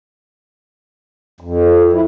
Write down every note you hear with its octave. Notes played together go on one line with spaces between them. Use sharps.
F2
E4